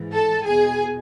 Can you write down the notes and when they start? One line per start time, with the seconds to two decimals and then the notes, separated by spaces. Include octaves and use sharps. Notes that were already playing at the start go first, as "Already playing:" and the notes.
Already playing: G#2 E3
0.12 A4 A5
0.45 E2 B2 G#4 G#5